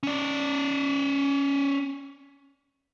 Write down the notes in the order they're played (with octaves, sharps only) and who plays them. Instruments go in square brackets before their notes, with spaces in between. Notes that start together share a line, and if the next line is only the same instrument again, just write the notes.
[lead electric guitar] C#4 D5